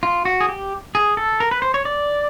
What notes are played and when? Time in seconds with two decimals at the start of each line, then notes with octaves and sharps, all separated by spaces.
0.03 F4
0.25 F#4
0.41 G#4
0.49 G4
0.95 G#4
1.17 A4
1.40 A#4
1.51 B4
1.62 C5
1.74 C#5
1.85 D5